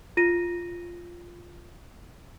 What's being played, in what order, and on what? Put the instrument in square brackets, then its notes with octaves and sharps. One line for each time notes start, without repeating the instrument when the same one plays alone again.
[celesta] F4 A#6 D#7